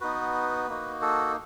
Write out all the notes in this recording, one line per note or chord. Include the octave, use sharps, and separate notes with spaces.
B3 D#4 F#4 B4
A#3 D#4 F#4
A4